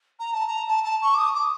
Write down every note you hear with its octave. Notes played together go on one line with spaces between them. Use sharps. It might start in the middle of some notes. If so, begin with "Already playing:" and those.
A#5
A5
A#5
A5
A5
C#6
D6
D#6
D6